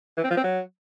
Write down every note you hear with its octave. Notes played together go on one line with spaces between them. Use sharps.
E3
C4
F3
C4
F#3